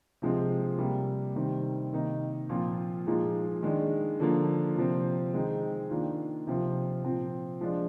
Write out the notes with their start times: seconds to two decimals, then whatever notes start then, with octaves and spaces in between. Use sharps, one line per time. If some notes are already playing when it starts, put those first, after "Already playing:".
0.22 C3 F3 G#3 C4
0.78 C3 G3 A#3
1.35 C3 D#3 G3 C4
1.93 C3 D#3 A#3 D#4
2.49 A#2 F3 C4 F4
3.06 A#2 F3 G#3 D#4
3.63 D#3 G#3 D4
4.20 D3 F3 A#3
4.76 C3 F3 C4
5.33 D#3 G#3 C4 D#4
5.91 D#3 A#3 D4 F4
6.47 C3 F3 C4 F4
7.04 A#2 F3 C4
7.61 F3 G#3 D4 F4